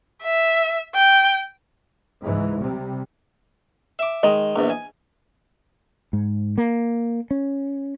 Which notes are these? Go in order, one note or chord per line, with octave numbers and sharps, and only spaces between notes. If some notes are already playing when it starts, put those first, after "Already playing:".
E5
G5
C#2 G#2 E3
C3 G3
E5 D6
D#3 G#3 D#5
A#1 E2
G#5
G#2
A#3
C#4